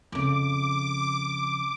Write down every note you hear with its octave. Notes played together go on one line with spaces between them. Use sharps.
F2 C#3 D6